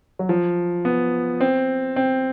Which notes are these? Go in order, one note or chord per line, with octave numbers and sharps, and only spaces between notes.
F#3
F3
B3
C4
C4